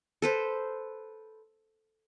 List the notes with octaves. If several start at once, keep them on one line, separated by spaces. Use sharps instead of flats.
A4 B4 C5